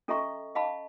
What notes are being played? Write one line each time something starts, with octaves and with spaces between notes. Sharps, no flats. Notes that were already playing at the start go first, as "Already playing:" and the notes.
C#4 A4 D#5 E5 A#5 C#6
D#5 F5 A5 B5